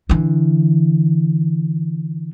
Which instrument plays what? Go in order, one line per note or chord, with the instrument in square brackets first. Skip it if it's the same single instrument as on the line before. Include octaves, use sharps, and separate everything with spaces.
[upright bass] D3 E3